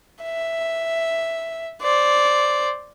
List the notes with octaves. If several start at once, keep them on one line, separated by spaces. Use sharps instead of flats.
E5
C5 D5